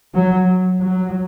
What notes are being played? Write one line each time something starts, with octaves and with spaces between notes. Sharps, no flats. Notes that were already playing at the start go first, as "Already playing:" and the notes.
F#3
F#3